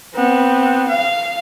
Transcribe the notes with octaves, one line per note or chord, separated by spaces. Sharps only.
B3 C4
F5